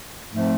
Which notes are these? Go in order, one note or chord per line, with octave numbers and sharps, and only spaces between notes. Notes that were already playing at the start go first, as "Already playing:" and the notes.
G#2 F3 A3 C4